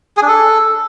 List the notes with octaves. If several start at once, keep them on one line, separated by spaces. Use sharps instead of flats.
G#4
D4
A4